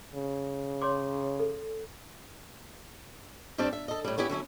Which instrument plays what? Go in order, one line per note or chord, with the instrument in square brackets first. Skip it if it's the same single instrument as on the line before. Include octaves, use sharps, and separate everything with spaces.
[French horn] C#3
[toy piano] C#5 C6 D6
A4
[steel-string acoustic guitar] G2 G3 C4 D4 G4 D5
E5
A4 D#5
A2 G3
B3 C#4 E4 G4
D3 F#3 C#4 E4